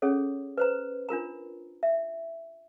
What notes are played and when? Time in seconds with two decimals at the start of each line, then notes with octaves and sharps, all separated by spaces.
0.02 C#4 G#4 A4 C#5
0.58 B4 C5 A#5
1.09 D4 F4 A#4 A#5
1.83 E5